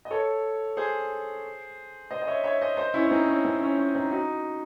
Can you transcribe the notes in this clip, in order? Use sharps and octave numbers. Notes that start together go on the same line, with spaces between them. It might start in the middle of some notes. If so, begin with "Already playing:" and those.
D#5
A4 C#5
G#4 C5
C5 D#5
D#5
C#5 E5
C#5 E5
C5 D#5
C5 D#5
C#4 E4
C#4
C4 D#4
C#4
C4
C#4
C#4
C4 D#4
D#4 F#4